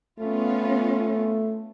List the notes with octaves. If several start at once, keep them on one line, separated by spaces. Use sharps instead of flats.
A3 B3 C#4 F4